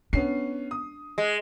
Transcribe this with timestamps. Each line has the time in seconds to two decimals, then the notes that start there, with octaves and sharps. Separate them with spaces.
0.13 B3 C#4 D4 C7
0.71 D#6
1.18 G#3